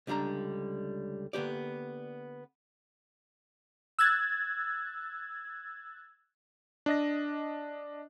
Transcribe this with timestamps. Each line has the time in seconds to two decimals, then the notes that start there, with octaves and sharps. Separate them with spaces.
0.07 C#2 D3 G3 D4 A#5
1.33 D3 A#3 B3 G4 D5
3.99 E6 F#6 G#6 A6
6.86 D4 D#5 A#6